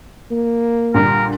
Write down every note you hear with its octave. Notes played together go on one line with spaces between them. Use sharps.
A#3
A#2 D3 G3 A#4